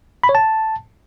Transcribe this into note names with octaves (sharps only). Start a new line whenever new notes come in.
B5
C#5
A5